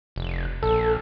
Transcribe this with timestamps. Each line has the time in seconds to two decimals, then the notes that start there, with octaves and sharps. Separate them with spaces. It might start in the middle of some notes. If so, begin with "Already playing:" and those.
0.16 F1
0.63 A#1 A4